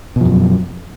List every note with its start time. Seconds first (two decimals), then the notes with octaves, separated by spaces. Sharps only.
0.16 B2
0.21 F3
0.25 F#2